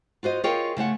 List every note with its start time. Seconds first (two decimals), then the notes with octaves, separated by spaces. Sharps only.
0.23 F4 F#4 C5 D#5
0.44 F4 G#4 A#4 C#5 D#5 G5
0.77 C#3 A3 C#5 F#5